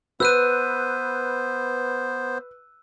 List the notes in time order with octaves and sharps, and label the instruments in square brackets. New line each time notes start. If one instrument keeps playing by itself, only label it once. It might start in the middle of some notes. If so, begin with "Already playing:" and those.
[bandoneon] B3 C5 [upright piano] B4 [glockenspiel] E6 F#6 D#7